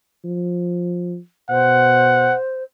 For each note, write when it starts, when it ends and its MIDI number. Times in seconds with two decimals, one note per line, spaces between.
0.24 1.18 53
1.50 2.32 47
1.50 2.63 72
1.50 2.36 78